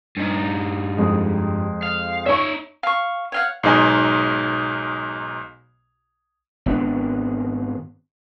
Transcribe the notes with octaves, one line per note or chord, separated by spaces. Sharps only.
G2 D#4
F2 G#3
F5
D#4 C#5 E5 C#6
F5 C#6
C#5 F5 F#5
B1 G#2 D#4 G#5
G#1 B3 D4